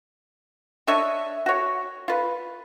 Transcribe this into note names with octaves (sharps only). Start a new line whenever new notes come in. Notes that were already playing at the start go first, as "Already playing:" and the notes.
D4 C#5 D#5 E5
F#4 C#5
F4 B4